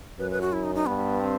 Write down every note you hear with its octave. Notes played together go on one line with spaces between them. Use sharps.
F#2 B4
B4
F#4
E4
D#4
D#4
G2 B3
C4